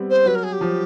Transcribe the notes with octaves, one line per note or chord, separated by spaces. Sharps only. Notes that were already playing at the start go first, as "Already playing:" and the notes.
Already playing: G3 B3 C4
C5
F#3 B4
A#4
G#4
G4
F3